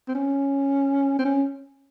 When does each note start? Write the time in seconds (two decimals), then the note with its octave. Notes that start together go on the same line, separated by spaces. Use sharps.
0.08 C4
0.15 C#4
1.19 C4
1.25 C#4